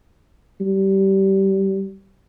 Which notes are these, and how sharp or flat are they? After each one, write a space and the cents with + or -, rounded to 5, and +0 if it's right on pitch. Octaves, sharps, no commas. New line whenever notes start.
G3 -20